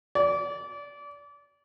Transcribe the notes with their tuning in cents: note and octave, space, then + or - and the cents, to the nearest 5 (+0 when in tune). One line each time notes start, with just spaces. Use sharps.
D5 -30